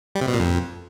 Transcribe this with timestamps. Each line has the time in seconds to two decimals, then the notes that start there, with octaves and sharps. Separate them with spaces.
0.15 G3
0.21 C3
0.28 B2
0.34 A#2
0.40 F2